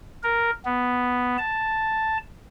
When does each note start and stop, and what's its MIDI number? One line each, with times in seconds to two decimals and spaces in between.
0.23 0.50 70
0.65 1.37 59
1.38 2.18 81